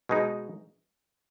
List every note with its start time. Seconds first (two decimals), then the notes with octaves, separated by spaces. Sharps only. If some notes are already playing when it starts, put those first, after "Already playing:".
0.09 B2 G#3 D#4